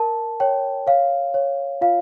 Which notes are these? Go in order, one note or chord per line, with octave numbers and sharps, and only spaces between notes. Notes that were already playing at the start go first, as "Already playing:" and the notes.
Already playing: A#4 A5
C#5 G5
C#5 F5
C#5
F4 F5